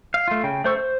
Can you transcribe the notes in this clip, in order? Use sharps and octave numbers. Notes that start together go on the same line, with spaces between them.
F5
A3 F4
C#3 G5
A3 C5 C#6 E6
C5